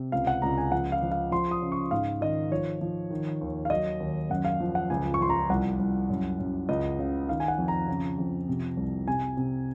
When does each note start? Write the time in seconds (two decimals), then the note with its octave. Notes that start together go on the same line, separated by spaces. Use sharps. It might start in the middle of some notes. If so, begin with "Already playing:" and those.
Already playing: C3
0.12 C#2 F5
0.27 F#5
0.42 C#2 A#5
0.58 G#5
0.72 F3 F#5
0.92 F5
1.02 F3
1.12 F5
1.31 F3 C6
1.51 D#6
1.62 C#3
1.72 C#6
1.91 G#2 F5
2.21 D#3 D#5
2.51 F3 C#5
2.81 F3
3.10 D#3
3.41 D#2
3.65 F5
3.70 F#3 D#5
4.00 D#2
4.30 F#2 F#5
4.45 F5
4.60 F3
4.75 F#5
4.90 C#2 G#5
5.14 C#6
5.20 F3 C6
5.30 A#5
5.50 C2 F#5
5.79 C2
6.10 F#2
6.39 F#2
6.69 C#2 D#5
6.99 C#3
7.28 D#3 F5
7.40 G#5
7.48 F#5
7.58 F2
7.68 A#5
7.88 C#3
8.19 F2
8.48 C3
8.77 C2
9.07 C3 G#5
9.37 C3